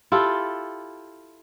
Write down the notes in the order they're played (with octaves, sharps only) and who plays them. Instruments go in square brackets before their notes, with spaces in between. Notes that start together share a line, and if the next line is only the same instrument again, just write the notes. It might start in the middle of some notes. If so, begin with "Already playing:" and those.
[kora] E4 F4 G4 A4